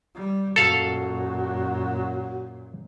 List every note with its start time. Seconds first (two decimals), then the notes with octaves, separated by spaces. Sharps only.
0.15 G3
0.56 F#2 A#2 F#4 A4 F5